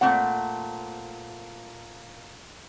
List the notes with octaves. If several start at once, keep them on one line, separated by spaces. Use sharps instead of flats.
A#2 A3 C4 F#5